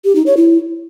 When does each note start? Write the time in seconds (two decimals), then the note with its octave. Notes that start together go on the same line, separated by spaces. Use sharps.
0.05 G4
0.16 D#4
0.26 C#5
0.37 E4